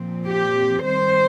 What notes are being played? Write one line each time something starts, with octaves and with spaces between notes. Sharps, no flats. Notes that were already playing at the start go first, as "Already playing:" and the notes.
Already playing: A#2 F3 C4
G4
D#3 G3 C4 C5